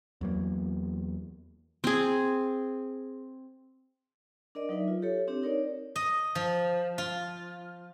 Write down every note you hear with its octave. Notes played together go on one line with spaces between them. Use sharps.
E2 F#3 A#3
C4 G#4
D4 A#4 D5 D#5
F#3 D#4 B4 E5
F4
G4 A4 C#5
C4 D4 G4
D#4 A#4 C#5 D5
D#5
F3
F4